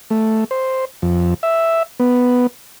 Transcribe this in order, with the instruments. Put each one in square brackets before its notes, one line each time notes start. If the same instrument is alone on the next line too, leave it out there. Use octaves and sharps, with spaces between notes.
[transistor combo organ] A3
C5
F2
E5
B3